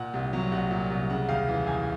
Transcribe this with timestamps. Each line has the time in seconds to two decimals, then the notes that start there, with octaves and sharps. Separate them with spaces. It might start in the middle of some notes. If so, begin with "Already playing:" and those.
Already playing: A#2 F#5
0.14 C2
0.33 F#3
0.52 C2 F#5
0.71 A#2
0.90 C2
1.10 C#3 F#5
1.28 D#2 F5
1.48 E3
1.67 D#2 G#5